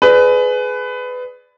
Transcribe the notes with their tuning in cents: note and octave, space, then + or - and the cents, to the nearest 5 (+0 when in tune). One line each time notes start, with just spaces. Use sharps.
G#4 +25 B4 +20 D5 +0